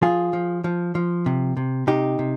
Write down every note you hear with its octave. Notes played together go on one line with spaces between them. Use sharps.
F3 F4 G#4
F3
F3
F3
C3
C3
C3 D#4 G4
C3